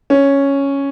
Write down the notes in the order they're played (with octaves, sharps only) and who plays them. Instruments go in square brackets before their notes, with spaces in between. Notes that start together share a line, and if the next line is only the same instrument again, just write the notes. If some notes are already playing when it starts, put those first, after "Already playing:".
[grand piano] C#4